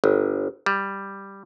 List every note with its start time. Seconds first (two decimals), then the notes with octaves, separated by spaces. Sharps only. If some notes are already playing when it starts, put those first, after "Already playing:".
0.04 G1
0.66 G3